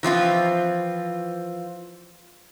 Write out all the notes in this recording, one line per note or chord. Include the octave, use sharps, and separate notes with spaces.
E3 F3 C4 F4